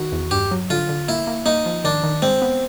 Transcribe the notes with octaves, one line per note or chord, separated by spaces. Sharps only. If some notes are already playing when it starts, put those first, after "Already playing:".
Already playing: D#3 F#4
E2
G2 G4
F#3
D3 F4
D3
A#3 E4
A#3
A#3 D#4
F3
D#3 D4
D#3
G#3 C4
B3